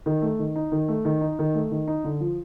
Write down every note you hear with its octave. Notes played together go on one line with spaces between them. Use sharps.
D#3
A3
D#3
D#4
D#3
A3
D#3
D#4
D#3
A3
D#3
D#4
D3
F3